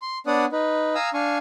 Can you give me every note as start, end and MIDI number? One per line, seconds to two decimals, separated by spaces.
0.02 0.18 84
0.27 0.45 59
0.27 0.45 62
0.27 0.45 73
0.27 0.45 74
0.27 0.45 78
0.27 0.45 87
0.52 0.94 63
0.52 0.94 71
0.95 1.10 77
0.95 1.10 80
0.95 1.10 82
0.95 1.10 87
0.95 1.10 88
1.14 1.38 62
1.14 1.38 77
1.14 1.38 80
1.14 1.38 85